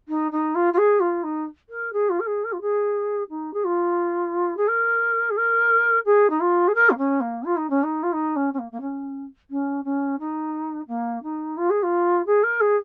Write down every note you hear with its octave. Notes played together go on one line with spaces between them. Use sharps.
D#4
D#4
F4
F4
G#4
F4
D#4
A#4
G#4
F4
A#4
G#4
A#4
F4
G#4
D#4
G#4
F4
G#4
A#4
G#4
A#4
G#4
D#4
F4
G#4
A#4
A#3
C#4
A#3
F4
D#4
C#4
D#4
F4
D#4
C#4
C#4
A#3
A#3
C#4
C#4
C#4
D#4
A#3
D#4
F4
G#4
F4
G#4
A#4
G#4